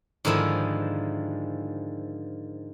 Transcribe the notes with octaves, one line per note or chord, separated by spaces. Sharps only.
G#2 D3 D#3 F3 E4